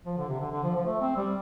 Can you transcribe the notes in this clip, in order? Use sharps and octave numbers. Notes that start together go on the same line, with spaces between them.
F3
D3
C3
D3
D3
F3
F3
A3
C4
G3